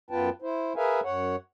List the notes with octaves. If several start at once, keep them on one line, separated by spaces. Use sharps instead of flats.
F#2 B3 F4 B4 G5 A5
E4 C5
G#4 A#4 B4 E5 F5 G#5
F#2 C#5 F#5